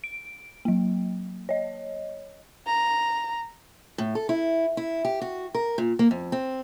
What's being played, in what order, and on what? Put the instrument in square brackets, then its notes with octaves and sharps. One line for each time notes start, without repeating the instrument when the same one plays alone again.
[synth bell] D7
F#3 A#3
C#5 D#5
[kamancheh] A#5
[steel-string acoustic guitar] A2
A4
E4
E4
G4
F#4
A#4
A#2
A#3
F2
C4